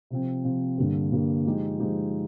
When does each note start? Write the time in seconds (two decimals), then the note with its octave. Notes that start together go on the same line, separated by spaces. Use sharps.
0.10 C3 F3 C4
0.44 C3 F3 C4
0.78 G2 D3 G3 A#3
1.12 G2 D3 G3 A#3
1.46 F3 G#3 D#4 G4
1.80 F3 G#3 D#4 G4